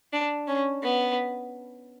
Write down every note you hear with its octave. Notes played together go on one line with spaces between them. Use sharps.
D4
C#4
B3